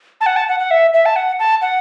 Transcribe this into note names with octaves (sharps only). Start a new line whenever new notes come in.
A5
F#5
A5
F#5
F#5
E5
E5
A5
F#5
A5
F#5